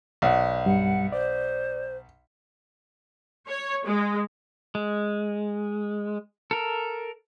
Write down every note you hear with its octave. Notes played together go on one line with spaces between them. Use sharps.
B1 D5 F#5
G2 G3 F#5
C5 D5
C#5
G#3
G#3
A4 A#4